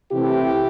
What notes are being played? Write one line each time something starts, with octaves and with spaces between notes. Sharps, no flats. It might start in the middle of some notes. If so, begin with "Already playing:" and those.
C3 E3 A3 C4 E4 G4